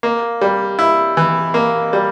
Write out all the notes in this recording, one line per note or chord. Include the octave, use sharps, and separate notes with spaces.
A#3
G3
E4
E3
A#3
G3